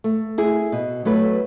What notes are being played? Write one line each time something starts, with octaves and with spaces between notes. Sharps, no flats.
A3
E4 G#4
B2
F#3 A3 E4 B4